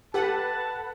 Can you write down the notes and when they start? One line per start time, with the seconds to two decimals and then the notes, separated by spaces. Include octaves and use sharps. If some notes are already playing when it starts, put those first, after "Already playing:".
0.14 G4 A4 B4 F#5 A5